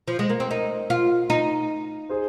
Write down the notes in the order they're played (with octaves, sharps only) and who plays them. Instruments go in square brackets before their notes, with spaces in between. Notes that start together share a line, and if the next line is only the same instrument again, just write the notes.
[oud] F3
G#3
A#3
C4
[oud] D#4 [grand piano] A#4 D#5
[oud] F4
D#4
[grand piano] G#4 C5